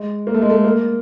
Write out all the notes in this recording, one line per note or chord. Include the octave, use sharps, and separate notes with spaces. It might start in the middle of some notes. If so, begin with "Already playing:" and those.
Already playing: G#3
A#3
A3
G#3
A3
A#3